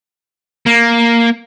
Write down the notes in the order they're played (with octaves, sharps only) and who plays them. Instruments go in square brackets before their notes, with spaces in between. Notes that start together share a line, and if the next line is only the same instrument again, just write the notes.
[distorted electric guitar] A#3